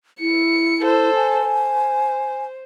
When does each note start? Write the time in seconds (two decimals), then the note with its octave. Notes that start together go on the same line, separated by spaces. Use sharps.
0.20 E4 C#7
0.81 A4 C5
1.15 G#5
1.47 C5